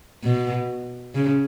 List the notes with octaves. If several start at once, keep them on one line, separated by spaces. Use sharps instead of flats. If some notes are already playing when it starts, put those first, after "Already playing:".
B2
C#3